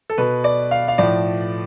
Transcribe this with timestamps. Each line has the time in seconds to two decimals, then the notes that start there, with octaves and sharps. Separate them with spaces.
0.10 A4
0.18 B2 B4
0.44 D5
0.71 F5
0.88 F5
0.98 A2 F3 D5